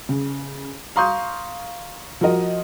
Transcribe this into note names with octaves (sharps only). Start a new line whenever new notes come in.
C#3
F5 A#5 C6 C#6 D#6 G6
F3 F#4 A#4 D#5